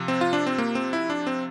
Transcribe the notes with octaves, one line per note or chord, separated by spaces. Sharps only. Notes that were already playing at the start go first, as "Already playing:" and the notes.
Already playing: C3 F3
C4
F4
D4
C4
A#3
C4
E4
D4
C4